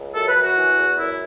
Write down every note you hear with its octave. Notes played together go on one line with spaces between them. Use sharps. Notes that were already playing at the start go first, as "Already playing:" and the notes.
Already playing: C#2
F#2 A4
B4
F#2
F#4
E3
E2
F#2 E4